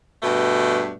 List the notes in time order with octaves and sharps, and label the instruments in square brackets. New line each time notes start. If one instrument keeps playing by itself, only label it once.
[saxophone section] G2 B2 A3